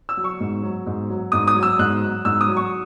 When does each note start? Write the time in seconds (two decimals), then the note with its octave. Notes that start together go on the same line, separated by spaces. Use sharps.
0.09 E6
0.17 F#3
0.24 C#6
0.40 G#2
0.62 F#3
0.86 G#2
1.09 F#3
1.32 G#2 D#6
1.48 D#6
1.55 F#3
1.63 E6
1.79 G#2 F#6
2.01 F#3
2.25 G#2 E6
2.41 D#6
2.48 F#3
2.56 C#6